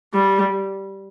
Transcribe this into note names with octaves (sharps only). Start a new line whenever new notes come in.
G3